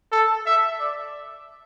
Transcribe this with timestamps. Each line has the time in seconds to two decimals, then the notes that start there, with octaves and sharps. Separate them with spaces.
0.12 A4
0.46 E5
0.80 D5